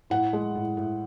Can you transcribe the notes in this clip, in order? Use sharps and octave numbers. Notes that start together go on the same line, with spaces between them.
A2 F#5
G#3
A2
A2